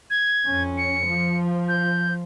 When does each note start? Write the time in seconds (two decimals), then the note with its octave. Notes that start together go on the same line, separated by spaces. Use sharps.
0.10 G#6
0.47 F2 C#4
0.78 C#7
1.07 F3
1.69 G6